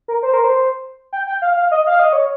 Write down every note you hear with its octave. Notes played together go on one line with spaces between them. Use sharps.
A#4
C5
A#4
C5
G5
G5
F5
F5
D#5
F5
D#5
C#5